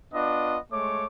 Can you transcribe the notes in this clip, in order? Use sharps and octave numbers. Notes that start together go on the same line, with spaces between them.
B3 D4 F4 D#5
G#3 A3 C#5 D6